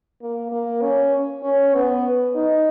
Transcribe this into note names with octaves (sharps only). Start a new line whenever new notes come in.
A#3
A#3
C#4
C#4
B3
D#4